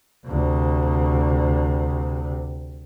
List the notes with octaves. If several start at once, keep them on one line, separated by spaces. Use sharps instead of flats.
D2 C3